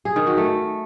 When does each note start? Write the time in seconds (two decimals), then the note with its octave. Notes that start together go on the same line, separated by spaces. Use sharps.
0.05 G#4
0.16 D#3
0.27 F#4
0.37 A3